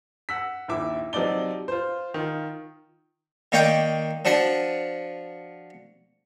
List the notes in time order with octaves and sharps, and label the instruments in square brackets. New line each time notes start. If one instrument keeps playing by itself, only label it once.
[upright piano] F#5 E6 B6
A#1 D#2 E4 E5 D6
C3 F3 F#3 D#4 D5 G7
F4 C5
D#3 F4
[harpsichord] D#3 A#3 C#5 D5 G5 D6
F3 D4 F#4 F#5